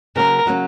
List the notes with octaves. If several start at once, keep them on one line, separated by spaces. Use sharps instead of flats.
C#3 F#3 A#3 C#4 A#4
C#3 F#3 A#3 C#4